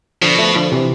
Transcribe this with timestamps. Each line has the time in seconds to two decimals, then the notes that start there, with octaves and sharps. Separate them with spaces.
0.21 B2 D3 F3
0.38 F3 A3
0.56 D3 F3
0.72 C3 E3